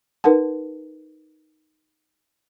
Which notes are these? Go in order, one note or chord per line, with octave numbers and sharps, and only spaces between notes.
D#4 A#4 B4 F#5 A5